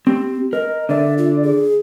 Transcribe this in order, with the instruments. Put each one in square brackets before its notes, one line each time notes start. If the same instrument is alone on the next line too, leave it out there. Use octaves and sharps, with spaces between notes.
[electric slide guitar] C4 [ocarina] G4
[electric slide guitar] A#4 [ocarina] D#5
[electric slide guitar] D3 D5 [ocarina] E5
[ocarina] F4
G#4